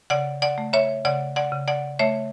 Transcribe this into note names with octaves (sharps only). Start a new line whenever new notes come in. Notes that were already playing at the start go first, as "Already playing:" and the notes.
C#3 D5 F#5
D5 F#5
A3
C#5 E5
C#3 D5 F#5
D5 F#5
C#3
D5 F#5
A3 C#5 E5